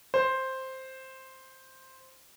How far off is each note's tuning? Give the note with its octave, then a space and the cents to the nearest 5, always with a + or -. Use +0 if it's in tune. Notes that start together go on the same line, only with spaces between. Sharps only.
C5 +5